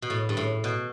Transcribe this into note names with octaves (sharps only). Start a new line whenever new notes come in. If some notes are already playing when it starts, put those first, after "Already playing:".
B2
A2
G2
A2
B2